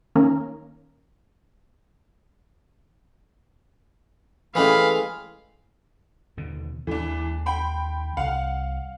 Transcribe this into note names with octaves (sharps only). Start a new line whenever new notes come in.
D#3 A#3 C#4 A#4
E3 G#3 A3 C#4 G4 B4 F5 B5
D#2 B2 D3
D#2 E3 G#3 D4
G5 B5 C6
C2 F5 F#5